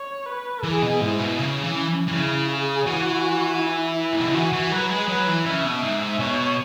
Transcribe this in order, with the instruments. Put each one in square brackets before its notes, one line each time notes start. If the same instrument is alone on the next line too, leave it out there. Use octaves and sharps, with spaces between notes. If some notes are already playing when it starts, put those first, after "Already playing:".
Already playing: [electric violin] C#5
B4
[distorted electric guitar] E3 [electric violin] G#4
[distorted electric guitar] B2
[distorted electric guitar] G#2 [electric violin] E4
[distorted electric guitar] B2
[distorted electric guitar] C#3 [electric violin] C#4
[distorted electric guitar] E3
E3
[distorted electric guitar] C#3 [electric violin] E4
[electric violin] G#4
[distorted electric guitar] E3 [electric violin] F#4
[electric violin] E4
[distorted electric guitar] G#2
B2
C#3
[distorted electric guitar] E3 [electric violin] F#4
[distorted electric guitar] E3
[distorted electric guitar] F#3 [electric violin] B4
[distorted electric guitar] G#3
[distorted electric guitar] F#3 [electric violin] B4
[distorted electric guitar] E3
[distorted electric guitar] C#3 [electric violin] E5
[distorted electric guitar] B2
[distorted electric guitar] G#2 [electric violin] E5
[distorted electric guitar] B2 [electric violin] C#5